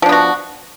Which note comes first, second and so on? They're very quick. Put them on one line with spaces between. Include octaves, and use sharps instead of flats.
F3 D4 B3 F#4